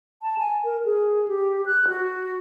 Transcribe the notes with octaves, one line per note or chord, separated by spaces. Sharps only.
A5
G#5
A#4
G#4
G4
F#6
F#4